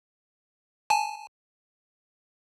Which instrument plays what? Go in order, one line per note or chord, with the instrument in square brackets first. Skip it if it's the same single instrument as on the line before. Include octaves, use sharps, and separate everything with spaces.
[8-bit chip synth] G#5 A5